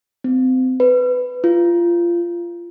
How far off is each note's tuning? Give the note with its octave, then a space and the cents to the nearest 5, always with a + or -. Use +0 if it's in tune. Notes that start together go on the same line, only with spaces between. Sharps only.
C4 -30
B4 +15
F4 -20